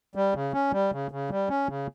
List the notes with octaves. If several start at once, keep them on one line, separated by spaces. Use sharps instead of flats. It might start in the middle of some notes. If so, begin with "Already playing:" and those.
G3
C#3
C#4
G3
C#3
C#3
G3
C#4
C#3